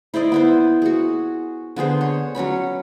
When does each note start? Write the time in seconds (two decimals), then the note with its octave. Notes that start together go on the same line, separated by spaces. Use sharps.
0.14 E4 C5 D5 D#5
0.32 B3 E4 C5
0.82 F#4 G#4
1.76 D3 B3 G#4 C5
2.01 C#5
2.35 F#3 C#4 C#5 B5